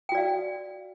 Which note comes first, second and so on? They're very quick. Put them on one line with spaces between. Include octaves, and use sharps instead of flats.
G5 F#4 D5 F5